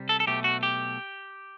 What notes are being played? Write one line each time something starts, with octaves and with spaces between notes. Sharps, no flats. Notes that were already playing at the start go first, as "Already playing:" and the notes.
Already playing: C2 C3 G3
A4
A4
B1 B2 A3 G4
F#4
G4